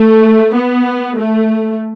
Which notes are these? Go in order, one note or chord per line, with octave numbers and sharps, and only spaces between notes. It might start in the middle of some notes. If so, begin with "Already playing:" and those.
Already playing: A3
B3
A3